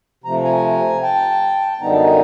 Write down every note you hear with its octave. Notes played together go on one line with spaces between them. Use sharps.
C3 F3 A3 A#5
G#5 A#5
G5 A5
F#2 D3 G3 B3 D#4 A#5
A5
G#5 A#5